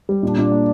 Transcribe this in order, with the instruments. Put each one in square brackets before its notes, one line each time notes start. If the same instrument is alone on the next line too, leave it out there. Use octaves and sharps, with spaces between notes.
[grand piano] G3
[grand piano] A#2 [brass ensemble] D4
[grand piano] A#2
A#3